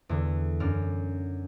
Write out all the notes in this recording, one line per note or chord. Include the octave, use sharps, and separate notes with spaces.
E2 D3
F#2 D4 F6